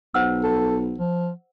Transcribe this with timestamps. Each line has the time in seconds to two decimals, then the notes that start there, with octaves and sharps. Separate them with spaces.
0.14 B1 C5 F#5 E6
0.44 A4
0.99 F3